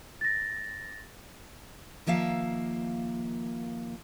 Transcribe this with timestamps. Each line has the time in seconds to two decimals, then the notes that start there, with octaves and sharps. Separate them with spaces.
0.21 A6 A#6
2.06 D#3 F3 A#3 E5 F5